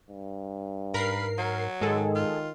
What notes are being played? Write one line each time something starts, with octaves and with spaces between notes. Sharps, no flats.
G2
G#2 A#4 B4 C7
F#3
G#2 D#3 G#3 G#4 A4
F4